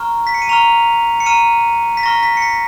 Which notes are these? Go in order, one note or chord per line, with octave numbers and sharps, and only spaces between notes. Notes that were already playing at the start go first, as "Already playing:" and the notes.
Already playing: A#5 C#6 F6
B6
C#7
D#7
A#5 C#6 F6 F7
C#7
A#5 C#6 F6 D#7
B6
A#5 C#6 F6 A#6
B6
C#7
B6